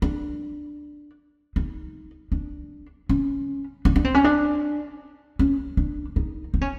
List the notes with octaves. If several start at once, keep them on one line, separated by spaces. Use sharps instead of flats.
D4
D#4
D4
C#4
D4
D4
C4
C#4
D4
C#4
D4
D#4
D#4
C#4